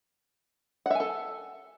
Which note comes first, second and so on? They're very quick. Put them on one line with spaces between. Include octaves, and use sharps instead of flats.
F#5 E5 G#5 A4